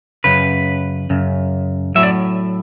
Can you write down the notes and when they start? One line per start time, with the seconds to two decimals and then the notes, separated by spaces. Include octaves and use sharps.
0.24 F#2 C#3 B4
1.10 F#2 C#3
1.95 A2 F#3 E5
2.03 D5